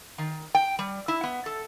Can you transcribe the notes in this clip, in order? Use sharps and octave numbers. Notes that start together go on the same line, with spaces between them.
D#3
G5
G3
E4
B3
A4